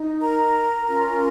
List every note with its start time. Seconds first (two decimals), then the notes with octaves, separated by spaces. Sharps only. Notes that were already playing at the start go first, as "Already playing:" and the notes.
Already playing: D#4
0.20 A#4 A#5
0.85 C#4 F4 A#4